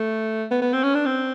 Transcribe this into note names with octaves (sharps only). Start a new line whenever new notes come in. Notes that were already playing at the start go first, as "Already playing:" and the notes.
Already playing: A3
B3
B3
C4
C#4
D4
C4